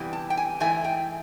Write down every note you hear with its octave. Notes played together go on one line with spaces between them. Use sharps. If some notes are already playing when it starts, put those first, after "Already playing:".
Already playing: C3 E3 G3 B3
A5
G5
G#5
G#2 E3 A3 G#5
G5